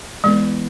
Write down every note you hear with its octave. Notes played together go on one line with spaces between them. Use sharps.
E2 E3 G#3 B3